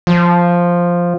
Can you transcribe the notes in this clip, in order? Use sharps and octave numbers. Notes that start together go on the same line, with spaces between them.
F3